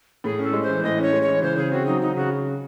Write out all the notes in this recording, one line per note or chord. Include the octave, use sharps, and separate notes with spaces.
A2 G#4
C#4 A4
G#3
E3 C5
A2 D#5
C#4 C#5
G#3
C#5
E3
C#3 C5
C#3 G#4
C4 F#4
F#3 D#4
C#3 D#4
C#3 F#4